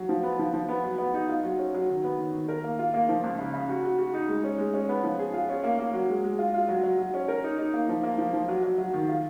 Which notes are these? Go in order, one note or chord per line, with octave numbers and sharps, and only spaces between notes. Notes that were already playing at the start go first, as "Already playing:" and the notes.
Already playing: F#3
F3
B3
F3
F3
B3
F#3
B3
D#4
F4
F#3
C#4
F#3
D#3
B3
D#3
D#3
A#4
A#3
F4
A#3
F3
C#2
C#3
C#3
F#4
F#4
F#4
D#4
G#3
C#4
G#3
C#4
B3
F3
G#4
F4
C#4
A#3
A#3
F#3
G#3
G#3
F4
F4
F#3
F#3
F#3
C#4
A#4
D#4
D#4
A#3
F3
A#3
F3
F3
F#3
F#3
F#3
D#3
F4